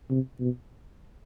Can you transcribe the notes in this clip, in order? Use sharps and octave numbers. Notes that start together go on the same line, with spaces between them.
C3
B2